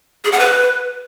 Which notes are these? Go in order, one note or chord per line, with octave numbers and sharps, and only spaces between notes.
G#4
F#5
B4